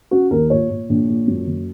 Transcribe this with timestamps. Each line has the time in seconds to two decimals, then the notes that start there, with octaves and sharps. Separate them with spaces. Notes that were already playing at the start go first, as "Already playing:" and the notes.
0.11 C#3 F#4
0.31 D#2 A#4
0.50 A#2 C#5
0.70 A#2
0.89 A#1
1.09 A#2
1.27 F#2
1.46 F#1